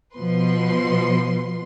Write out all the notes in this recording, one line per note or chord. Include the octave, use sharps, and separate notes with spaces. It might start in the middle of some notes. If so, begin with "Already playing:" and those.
B2 F3 B4 C6